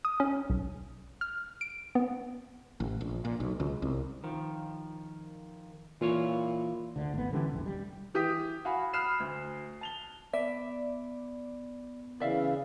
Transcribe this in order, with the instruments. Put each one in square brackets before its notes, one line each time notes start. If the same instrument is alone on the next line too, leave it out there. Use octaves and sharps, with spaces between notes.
[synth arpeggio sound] D#6
C#4
B1
F6
D7
B3
[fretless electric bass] A1
A#1
A#2
B1
C#2
C2
[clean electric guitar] D#3 F3
[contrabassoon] A#2 [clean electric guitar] E3 F4 C#5
[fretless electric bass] D2 D3
G#1 B3
D3 E3 G3 C#4
E1 A#1 E3
G3
[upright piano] E3 G4 D#6 B6
F#4 F5 G#5 B5
B5 D#6 F6 F#6 C7 E7
D2
A5 F7 G7
[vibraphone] B3 [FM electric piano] D5 [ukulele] E5
[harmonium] C#3 E3 [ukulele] D5 E5 F5